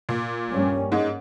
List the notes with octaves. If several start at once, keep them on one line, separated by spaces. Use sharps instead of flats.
A#2
G2 G3 A#3 C#4
G#2 G#3